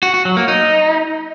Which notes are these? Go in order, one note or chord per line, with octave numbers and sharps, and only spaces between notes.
F#4
F#4
F#3
A#3
D#4